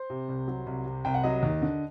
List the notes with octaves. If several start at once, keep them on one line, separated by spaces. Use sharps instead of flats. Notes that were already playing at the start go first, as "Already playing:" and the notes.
Already playing: C5
C3
C2
F#3
C2
C3
C2 G5
F#5
F#3 D#5
D#2
D3